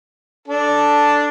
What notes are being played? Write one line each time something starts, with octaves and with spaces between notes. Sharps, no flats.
D4 A4